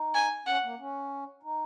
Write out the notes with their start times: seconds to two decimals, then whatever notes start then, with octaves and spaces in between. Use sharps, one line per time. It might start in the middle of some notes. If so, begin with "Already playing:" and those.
Already playing: D#4
0.15 G#5
0.47 C#4 F#5
0.64 A#3
0.79 C#4
1.43 D#4